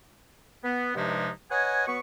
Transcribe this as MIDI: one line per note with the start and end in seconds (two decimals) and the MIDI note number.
0.64 0.92 59
0.95 1.29 43
0.95 1.29 48
0.95 1.29 53
0.95 1.29 56
0.95 1.29 63
0.95 1.29 64
1.51 1.84 71
1.51 1.84 73
1.51 1.84 75
1.51 1.84 78
1.51 1.84 80
1.87 1.99 54
1.87 1.99 59
1.87 1.99 71
1.87 1.99 85